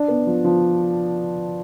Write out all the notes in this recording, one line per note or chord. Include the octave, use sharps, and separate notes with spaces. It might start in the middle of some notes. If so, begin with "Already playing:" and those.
Already playing: D4
B3
F3
F3